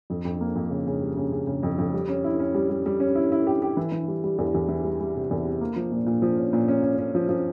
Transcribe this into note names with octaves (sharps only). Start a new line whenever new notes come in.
F2
F2
A#3
F2
C#3
C#3
G3
C#3
C#3
C#3
F2
F2
G3
C#4
E4
C#4
G3
G3
G3
C#4
E4
E4
G4
G4
E3
E3
G3
G3
E2
E2
E3
G3
G3
C3
E2
C3
A#3
F3
A#2
A#2
F3
C#4
A#2
C#4
C#4
C#4
F3
F3